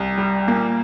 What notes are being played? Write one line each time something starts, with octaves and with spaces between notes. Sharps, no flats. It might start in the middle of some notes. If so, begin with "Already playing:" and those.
Already playing: C2
G3
A#2 A#3